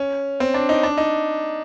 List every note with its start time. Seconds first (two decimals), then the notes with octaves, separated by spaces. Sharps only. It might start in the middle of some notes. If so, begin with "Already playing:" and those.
Already playing: C#4
0.40 C4
0.54 D4
0.69 D#4
0.83 D4
0.98 D#4